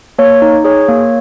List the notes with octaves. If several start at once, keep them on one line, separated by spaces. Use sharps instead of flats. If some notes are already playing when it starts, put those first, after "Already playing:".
A#3 C#5
D#4
G#4 C#5
A#3